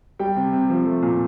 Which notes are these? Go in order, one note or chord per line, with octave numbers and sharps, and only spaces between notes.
G3 G5
C3
C3
F3
A3
A#2